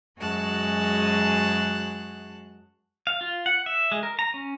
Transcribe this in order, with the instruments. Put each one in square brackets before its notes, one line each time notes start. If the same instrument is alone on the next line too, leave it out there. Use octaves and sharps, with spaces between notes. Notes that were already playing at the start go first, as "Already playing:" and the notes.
[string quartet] F#2 G#3 F#4 G#4 A5 F#6
[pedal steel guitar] F5
F4
F#5
E5
G#3
A#4
A#5
C#4